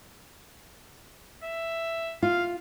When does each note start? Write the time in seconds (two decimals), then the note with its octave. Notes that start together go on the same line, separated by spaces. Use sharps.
1.44 E5
2.23 F4 F5